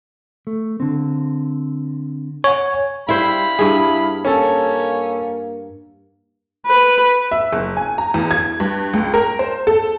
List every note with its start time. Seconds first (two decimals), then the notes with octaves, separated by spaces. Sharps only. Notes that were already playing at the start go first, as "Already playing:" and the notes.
0.47 A3
0.80 D3 C4
2.44 C#5 F#5 G#5
3.09 G3 E4 C5 F5 B5
3.59 G2 E4 G#4
4.25 A#3 C#4 A4 C#5 G#5
6.67 B4
7.31 E5
7.53 F#1
7.77 G#5
7.98 A#5
8.14 E2
8.31 G#6
8.60 G2
8.93 C#2
9.14 A#4
9.39 C5
9.67 A4